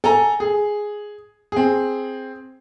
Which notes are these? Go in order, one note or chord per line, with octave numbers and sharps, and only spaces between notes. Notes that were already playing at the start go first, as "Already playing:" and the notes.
A4 G#5 A#5
G#4
C4 G#4